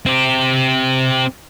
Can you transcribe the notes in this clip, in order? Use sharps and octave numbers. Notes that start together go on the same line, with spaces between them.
C4 G4